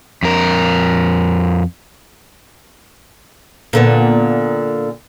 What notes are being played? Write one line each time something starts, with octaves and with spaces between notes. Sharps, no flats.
F2 A#4
A#2 D3 B3